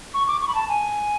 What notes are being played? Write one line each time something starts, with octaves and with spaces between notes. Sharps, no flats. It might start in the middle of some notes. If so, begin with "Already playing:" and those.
C#6
D6
C#6
B5
A5
G#5